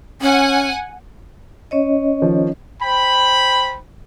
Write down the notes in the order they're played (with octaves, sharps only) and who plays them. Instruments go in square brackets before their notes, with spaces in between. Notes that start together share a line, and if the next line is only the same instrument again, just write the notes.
[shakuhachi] C#4 [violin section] F#5 G#5
[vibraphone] C#4 C#5 D#5
[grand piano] D#3 F3
[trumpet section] C5 G5 B5